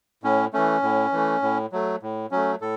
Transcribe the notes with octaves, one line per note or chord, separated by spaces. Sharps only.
A2 C#4
E3 A3 C#4
A2
E3 A3
A2
F#3 A3
A2
F#3 A3 C#4
A2 A4